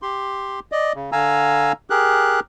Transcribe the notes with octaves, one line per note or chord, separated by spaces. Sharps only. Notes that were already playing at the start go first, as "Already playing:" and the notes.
G4 C6
D5 D#5
C#3
D3 F5 G#5 A#5 E6
G4 G#4 A#4 F#6